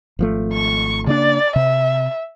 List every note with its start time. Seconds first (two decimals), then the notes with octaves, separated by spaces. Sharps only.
0.19 G#1 F3 A3
0.53 C#6
1.07 C#3 A#3 D4 D5
1.56 C3 E5